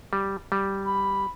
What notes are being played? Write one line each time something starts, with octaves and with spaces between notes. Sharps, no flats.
G3
G3
B5